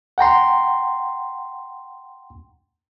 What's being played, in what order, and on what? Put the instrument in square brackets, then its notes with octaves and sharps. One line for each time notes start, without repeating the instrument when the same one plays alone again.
[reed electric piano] F#5 G5 A#5 C6